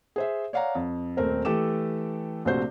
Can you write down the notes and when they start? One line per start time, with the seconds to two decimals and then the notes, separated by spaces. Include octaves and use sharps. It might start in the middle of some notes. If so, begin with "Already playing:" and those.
0.16 G#4 C5 E5
0.53 C#5 D5 F5 F#5 A#5
0.75 F2
1.17 D#1 A3 C4 A#4 C5
1.45 E3 A3 G4 A4 D6 E7
2.45 A#1 C3 A3 F#4 C5 G6